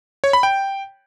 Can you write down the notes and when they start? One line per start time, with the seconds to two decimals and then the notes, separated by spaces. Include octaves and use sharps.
0.24 C#5
0.33 B5
0.43 G5